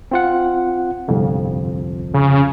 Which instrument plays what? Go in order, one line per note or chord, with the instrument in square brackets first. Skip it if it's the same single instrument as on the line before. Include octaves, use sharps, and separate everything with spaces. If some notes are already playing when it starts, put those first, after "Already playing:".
[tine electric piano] C4 F4 F#5
G1 C2 F2
[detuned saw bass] C#3